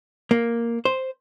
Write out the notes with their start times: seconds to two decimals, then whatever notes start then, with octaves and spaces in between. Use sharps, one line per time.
0.31 A#3
0.85 C5